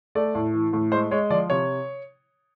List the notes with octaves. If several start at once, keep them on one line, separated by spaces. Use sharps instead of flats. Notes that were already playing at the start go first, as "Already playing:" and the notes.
A3 D5
A2
E3
A2
G#3 C5
G#3 C#5
F3 D5
C3 C#5